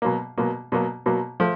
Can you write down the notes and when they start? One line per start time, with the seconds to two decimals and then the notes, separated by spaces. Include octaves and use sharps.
0.02 B2 F#3 A#3
0.38 B2 F#3 A#3
0.72 B2 F#3 A#3
1.06 B2 F#3 A#3
1.40 F3 A3